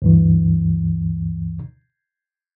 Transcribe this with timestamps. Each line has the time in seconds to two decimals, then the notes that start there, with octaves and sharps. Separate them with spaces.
0.02 D2 G2 E3